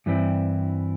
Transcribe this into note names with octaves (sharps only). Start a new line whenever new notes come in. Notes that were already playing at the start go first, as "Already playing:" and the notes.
G2 E3 G3 C4 E4